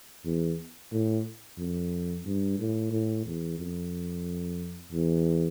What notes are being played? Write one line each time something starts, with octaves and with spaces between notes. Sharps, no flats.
E2
A2
F2
G2
A2
A2
E2
F2
E2